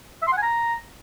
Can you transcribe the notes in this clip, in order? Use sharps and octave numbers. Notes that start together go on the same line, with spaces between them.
E5
C6
F#5
G#5
A#5